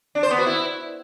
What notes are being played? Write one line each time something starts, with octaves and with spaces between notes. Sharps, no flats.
D4
C5
B3
F#4
E4